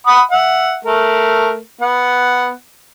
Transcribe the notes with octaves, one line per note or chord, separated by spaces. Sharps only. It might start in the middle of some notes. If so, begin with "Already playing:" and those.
F#5 B5 D#6
E5 F#5
A3 A#4
B3 F#5